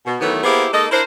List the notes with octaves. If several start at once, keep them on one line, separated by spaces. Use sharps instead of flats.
B2
D#3 E3 F#3 A3 B3
A#3 B3 E4 G4 G#4 C5
G#3 A#3 D#4 A4 D#5
D4 E4 A#4 C5